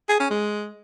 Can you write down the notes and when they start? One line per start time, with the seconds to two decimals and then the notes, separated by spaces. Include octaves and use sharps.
0.09 G#4
0.20 C#4
0.31 G#3